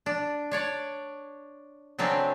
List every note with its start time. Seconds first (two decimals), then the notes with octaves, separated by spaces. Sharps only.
0.06 D4
0.51 D4 C#5 D5
1.99 C#3 F#3 A3 C4 D4